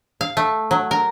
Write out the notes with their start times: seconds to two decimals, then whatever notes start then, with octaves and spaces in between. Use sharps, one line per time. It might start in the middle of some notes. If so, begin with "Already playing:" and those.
0.21 F5
0.37 A3
0.71 F#3
0.91 A#4